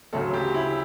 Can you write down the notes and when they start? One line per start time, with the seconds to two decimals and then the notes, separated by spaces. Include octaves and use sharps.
0.13 D2 C#3 F#3 A4
0.34 G4
0.54 E4